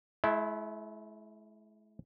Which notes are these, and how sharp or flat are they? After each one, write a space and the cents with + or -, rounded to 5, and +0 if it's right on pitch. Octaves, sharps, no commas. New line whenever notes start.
G#3 +45 E4 +0